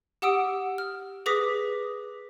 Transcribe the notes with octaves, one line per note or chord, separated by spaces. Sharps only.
G4 F#5 D#6 E6 D7
F6
G#4 B4 D6 D#6 A#6 B6